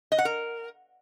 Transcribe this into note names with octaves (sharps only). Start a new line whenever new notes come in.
D#5
F#5
A#4